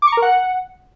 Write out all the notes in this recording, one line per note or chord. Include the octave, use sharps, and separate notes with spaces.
D6
C#6
A#5
A#4
F#5